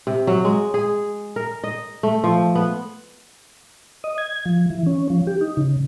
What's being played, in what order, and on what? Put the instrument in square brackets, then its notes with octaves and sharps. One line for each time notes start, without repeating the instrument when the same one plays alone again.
[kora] C3
F#3
G#3
G#4
A#4
D#5
A3
F3
B3
[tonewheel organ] D#5
G#6
F3
E3
C#4
F3
G4
D#4
C#3